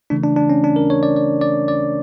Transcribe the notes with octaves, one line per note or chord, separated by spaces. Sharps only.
C#3 E3 A3 D4
D4
D4
C#4
D4
A#4
C#5
D5
D5
D5
D5